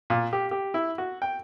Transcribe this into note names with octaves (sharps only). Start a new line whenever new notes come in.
A#2
G4
G4
E4
F#4
G5